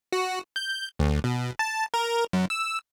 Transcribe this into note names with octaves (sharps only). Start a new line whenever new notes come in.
F#4
G6
D2
B2
A5
A#4
F#2
E6